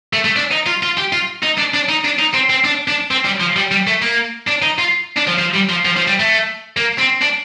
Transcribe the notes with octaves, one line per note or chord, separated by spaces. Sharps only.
A3
A3
D4
D#4
F4
F4
G4
F4
D#4
D4
D4
D#4
D4
D#4
C4
C4
D4
D4
C4
G3
F3
G3
G3
A3
A#3
D4
D#4
F4
D4
F3
F3
G3
F3
F3
F3
G3
A3
A#3
C4
D4